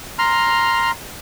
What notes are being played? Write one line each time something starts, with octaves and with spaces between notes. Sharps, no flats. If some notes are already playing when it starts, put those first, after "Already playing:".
A#5 C6 F6